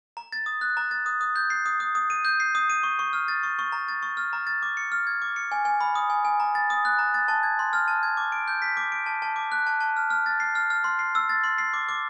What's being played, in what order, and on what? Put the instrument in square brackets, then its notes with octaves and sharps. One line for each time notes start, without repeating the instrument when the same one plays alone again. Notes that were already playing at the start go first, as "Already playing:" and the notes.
[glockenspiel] A#5
A6
D#6
F#6
A#5
A6
D#6
D#6
G6
C7
D#6
D#6
D#6
D#7
G6
C7
D#6
D#7
C#6
C#6
F6
A6
C#6
C#6
A#5
A6
C#6
F6
A#5
A6
D6
C#7
F6
G#6
D6
C#7
G#5
G#5
B5
D#6
G#5
G#5
A#5
A6
D#6
F#6
A#5
A6
A5
G#6
C6
F6
A5
G#6
D6
D7
G6
B6
D6
D7
A5
A5
D6
F#6
A5
A5
F6
F6
A6
C7
F6
F6
C6
C7
E6
A6
C6
C7
D6
D6